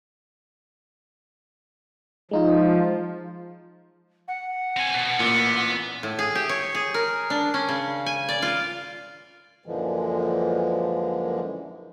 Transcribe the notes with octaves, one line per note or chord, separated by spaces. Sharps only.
F3 G#3 D#4 F4
F#5
C4 G#5
B2
A1 A#2 B3
A2
G#4
G4
C#5
G#4
A#4
D4
C#4
C#3
G#5
D5
F4
F#2 A#2 D3 E3 F3 G#3